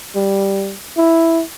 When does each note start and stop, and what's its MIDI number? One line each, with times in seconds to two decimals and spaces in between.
0.15 0.74 55
0.97 1.42 64